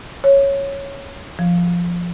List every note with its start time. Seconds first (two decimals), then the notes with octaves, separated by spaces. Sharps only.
0.24 C#5
1.39 F3